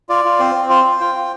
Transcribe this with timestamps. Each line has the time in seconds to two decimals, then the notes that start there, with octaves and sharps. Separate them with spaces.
0.09 F4 D5
0.25 F4
0.39 C4 C5
0.55 C4
0.69 F4 C5
0.85 F4
1.00 F4 G5
1.15 F4